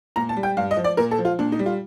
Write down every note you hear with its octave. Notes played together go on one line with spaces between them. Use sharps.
A#2 A#5
A5
G3
G5
G2 F5
D#5
F3
D5
A#2 A#4
A4
F3
F4
A#2 D4
D#4
G3
F4